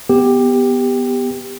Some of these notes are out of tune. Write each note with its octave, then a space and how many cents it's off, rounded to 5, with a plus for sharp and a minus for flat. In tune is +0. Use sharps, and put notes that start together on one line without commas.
B3 +0 G4 +10